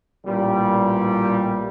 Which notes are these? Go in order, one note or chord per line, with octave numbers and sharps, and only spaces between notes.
A1 A#2 G3